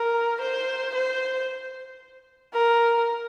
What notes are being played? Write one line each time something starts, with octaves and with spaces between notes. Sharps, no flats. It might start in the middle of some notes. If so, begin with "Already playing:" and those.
Already playing: A#4
C5
C5
A#4